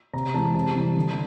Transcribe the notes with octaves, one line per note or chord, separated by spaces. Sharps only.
C3 A#5
E3 G#3 A5
C3 A5
E3 G3
D3